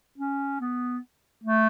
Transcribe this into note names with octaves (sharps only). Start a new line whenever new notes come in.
C#4
B3
A3